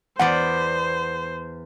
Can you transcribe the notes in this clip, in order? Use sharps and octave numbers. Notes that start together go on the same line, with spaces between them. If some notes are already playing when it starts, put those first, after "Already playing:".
E2 B3 C5 D5 F#5